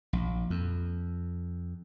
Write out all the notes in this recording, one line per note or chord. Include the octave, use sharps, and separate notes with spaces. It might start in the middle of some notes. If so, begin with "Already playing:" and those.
A#1
F2